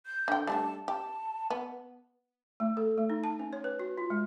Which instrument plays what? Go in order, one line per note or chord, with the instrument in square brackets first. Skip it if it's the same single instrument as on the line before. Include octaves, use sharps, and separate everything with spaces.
[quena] G6
[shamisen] D3 G5
[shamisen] G3 A3 D4 [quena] A5
[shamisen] G4 [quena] A5
[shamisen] B3
[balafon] A3
A4
A3
D#4
A5
C#4
C#5
B4
F#4
F4
G#3